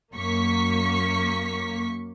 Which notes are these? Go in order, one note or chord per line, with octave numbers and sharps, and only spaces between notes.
F#2 A#3 C#6 B6